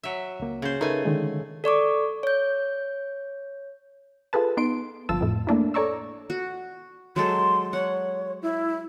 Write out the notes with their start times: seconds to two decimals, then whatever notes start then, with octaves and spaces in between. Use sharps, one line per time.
0.03 F#3 E5
0.40 C#2 A#3
0.62 C#3 C5
0.81 A3 D#4 A#4 B4 G#5
1.05 D3 D#3 G#3
1.64 A4 D5 C#6 D6
2.23 C#5 G6
4.33 F4 G#4 A4 B4 A5
4.57 B3 D#4 C6 D7
5.09 G1 F3 F4 A5 E6
5.21 F2 A2
5.47 A3 A#3 D4 E4
5.74 A4 C#5 D5 A#5 C#6 E6
6.30 F#4
7.16 F#3 G#3 A4 C6
7.73 C#5 F#5
8.42 E4